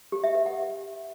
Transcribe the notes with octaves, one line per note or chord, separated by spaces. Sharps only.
G4
E5
B4
F#5